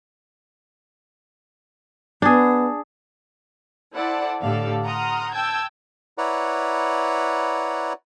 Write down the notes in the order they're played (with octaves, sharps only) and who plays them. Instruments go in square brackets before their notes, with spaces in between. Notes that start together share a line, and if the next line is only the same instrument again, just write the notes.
[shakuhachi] B3 [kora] D4 G#4
[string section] E4 A4 C5 D5 F#5 A5
A2 D3 G4 A4 D5 F5
F#5 A#5 C6 D#6 F6
G5 A5 E6 G6 G#6
[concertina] E4 B4 C#5 D5 F#5 A#5